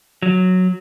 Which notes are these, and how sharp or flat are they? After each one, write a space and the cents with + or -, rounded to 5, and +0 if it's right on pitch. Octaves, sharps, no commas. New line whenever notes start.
F#3 -5